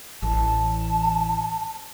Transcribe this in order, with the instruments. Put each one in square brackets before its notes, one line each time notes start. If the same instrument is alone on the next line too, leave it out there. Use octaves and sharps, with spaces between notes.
[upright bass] A1 E3 [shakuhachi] A5